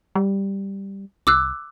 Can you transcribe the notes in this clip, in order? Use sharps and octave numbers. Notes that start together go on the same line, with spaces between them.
G3
C2 D6 E6 F#6